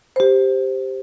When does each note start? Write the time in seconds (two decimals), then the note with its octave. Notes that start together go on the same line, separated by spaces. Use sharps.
0.16 G4 C5